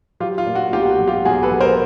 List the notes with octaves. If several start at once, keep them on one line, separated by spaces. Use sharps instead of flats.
F#3 F4 G4
F4
A#2
F#4
B1 F4 G4
F#4
F#3
F4 G4
B1 F#4 G#4
A4 B4
F#3
A#4 C5